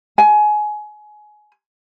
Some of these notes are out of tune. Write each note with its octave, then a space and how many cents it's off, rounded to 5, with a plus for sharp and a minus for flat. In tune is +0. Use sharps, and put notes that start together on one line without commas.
G#5 +25